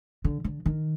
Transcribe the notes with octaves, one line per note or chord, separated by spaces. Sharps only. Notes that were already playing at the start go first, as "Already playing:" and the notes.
D3
D3
D#3